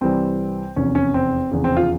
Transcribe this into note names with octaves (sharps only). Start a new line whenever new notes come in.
C2 C3 E3 G3 C4
F1 E2 C3 C#4
C#4
C4
F1 E2 C#3
C4
F4